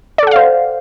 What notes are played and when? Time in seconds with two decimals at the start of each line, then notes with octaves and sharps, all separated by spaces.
0.18 D5
0.23 A4
0.27 F#5
0.31 F5
0.36 C5